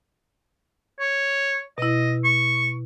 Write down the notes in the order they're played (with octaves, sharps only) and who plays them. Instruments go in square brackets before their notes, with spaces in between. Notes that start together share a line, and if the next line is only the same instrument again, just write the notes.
[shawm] C#5
[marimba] B2 E4 [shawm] D#5
[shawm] C#6